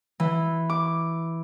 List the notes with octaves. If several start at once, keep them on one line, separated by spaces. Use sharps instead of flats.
E3
D6